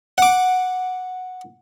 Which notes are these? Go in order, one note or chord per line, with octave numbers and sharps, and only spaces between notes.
F#5 D6